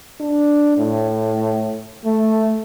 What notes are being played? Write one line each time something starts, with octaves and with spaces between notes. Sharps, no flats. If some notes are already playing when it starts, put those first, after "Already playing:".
D4
A2
A3